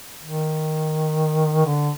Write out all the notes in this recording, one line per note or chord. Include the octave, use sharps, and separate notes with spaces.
D#3
D3